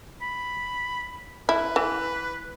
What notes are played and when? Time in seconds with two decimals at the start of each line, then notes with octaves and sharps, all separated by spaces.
0.22 B5
1.49 E4 B4
1.76 E3